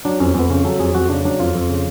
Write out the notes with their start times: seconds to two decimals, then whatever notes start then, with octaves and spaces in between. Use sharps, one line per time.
0.05 F#3 D4
0.20 F2 C#4
0.35 F2 B3
0.50 C#3 C#4
0.64 F#3 A4
0.79 F2 G#4
0.95 F2 F#4
1.09 C#3 D4
1.25 F#3 D4
1.40 F2 F4
1.55 F2
1.70 C#3